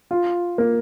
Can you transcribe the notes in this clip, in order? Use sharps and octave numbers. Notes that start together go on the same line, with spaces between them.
F4
A#3